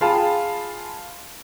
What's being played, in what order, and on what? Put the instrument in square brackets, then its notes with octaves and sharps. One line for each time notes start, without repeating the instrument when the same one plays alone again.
[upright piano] F4 G#4 F5 G5 A5 B5